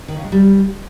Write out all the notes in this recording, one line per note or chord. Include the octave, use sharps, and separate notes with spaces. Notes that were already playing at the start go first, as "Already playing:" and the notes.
D#3
C#3
G#3
G3